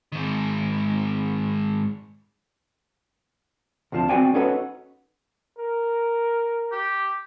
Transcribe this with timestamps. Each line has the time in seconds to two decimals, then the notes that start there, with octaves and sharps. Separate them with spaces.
0.12 G#2 D#3
3.92 D2 C3 F3 C5 A5
4.09 B3 C4 F#4 D5 G5 G#5
4.34 B3 C#4 D#4 F#4 A4 B4
5.58 A#4
6.72 G4